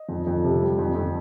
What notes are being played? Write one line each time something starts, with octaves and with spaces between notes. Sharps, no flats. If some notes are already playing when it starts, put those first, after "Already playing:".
Already playing: D#5
F2
F2
C3
G3
F2
F2